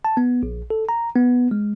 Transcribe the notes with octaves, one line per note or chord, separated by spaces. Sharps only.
A5
B3
A#1
A4
A#5
B3
G#3